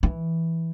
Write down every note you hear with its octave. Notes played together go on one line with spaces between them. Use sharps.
E3